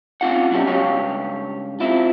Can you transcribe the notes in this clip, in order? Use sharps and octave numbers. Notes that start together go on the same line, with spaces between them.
C4 C#4 F4 F5 F#5
B2 F#3 G3 C#4 E4 G4
C#2 G2 G4 C#5 F5
C4 E4 F4